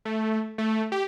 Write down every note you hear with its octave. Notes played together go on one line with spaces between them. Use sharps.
A3
A3
G4